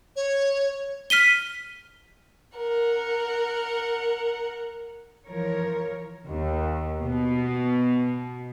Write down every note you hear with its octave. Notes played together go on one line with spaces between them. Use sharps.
C#5
F6 B6 D#7 G7
A#4 F#5
E3 F3 A#4 C#5
D#2
B2